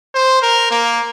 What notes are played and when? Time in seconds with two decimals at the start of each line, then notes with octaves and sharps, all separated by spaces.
0.15 C5
0.42 A#4
0.71 A#3